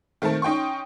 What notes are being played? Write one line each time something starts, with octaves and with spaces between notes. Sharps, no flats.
D#3 A3 C4 A#4 A5
C#4 D#4 G5 C6 C#6